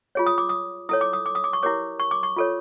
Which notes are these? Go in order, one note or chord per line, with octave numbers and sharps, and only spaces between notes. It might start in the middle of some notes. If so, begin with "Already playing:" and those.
F4 G#4 C#5
D#6
D6
D#6
E4 A4 C#5 D#6
D6
D#6
D6
D#6
D6
C#6
E4 G4 A#4 C#5 D6
C#6
D6
C#6
F4 A4 C#5